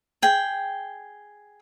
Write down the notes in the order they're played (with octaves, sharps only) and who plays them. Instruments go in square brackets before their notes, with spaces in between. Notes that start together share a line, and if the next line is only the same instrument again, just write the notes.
[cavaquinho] G#4 G5